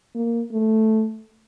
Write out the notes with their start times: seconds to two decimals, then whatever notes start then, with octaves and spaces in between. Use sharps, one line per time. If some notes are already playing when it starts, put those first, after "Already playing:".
0.15 A#3
0.52 A3